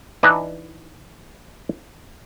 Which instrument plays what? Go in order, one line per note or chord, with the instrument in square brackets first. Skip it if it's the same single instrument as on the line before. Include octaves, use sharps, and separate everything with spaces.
[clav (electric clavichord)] E3 D4 D#4 B4 E5